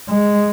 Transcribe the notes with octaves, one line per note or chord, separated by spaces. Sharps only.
G#3